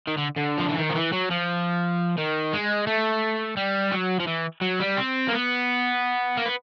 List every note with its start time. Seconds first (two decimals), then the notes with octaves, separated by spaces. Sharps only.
0.07 D#3
0.17 D3
0.36 D3
0.58 F3
0.68 E3
0.77 D#3
0.89 F3
0.95 E3
1.13 F#3
1.31 F3
2.18 D#3
2.53 G#3
2.87 A3
3.57 G3
3.92 F#3
4.20 F3
4.27 E3
4.62 F#3
4.80 G3
4.97 C4
5.28 A#3
5.32 B3
6.37 A#3
6.46 B3